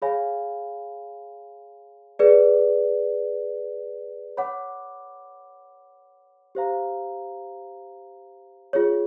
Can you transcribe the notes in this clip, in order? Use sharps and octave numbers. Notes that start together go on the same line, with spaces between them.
G#4 C#5 F5 G#5 B5
G#4 B4 D5
C#5 F#5 B5 D6
G4 C5 F5 A#5
F4 G#4 C#5